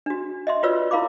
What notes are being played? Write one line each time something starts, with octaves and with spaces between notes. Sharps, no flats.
D4 F#4
D#5 E5 C6
F4 F#4 B4 C#5 D5 E6
E4 A#4 F5 B5 D6